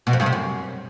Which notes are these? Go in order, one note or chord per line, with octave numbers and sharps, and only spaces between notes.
B2
F2
G2
C3
F#2